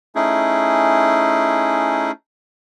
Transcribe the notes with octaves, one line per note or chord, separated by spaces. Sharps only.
A3 C#4 D#4 E4 G#4